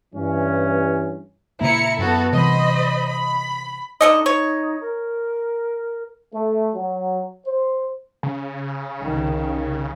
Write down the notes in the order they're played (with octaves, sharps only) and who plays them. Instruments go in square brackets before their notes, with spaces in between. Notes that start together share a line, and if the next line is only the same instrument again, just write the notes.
[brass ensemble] G2 E3 C#4
[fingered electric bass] A#2 C#3 A#3 [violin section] E4 A#5 C#7
[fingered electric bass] F#2 [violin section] B3 F#4 A4
[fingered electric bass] C3 E3 G3 [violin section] C5 D#5 B5
[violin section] B5
[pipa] D3 A4 D#5 [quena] D#4
[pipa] C#5
[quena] A#4
[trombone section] A3
F#3
C5
[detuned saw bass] C#3
[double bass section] C2 D#3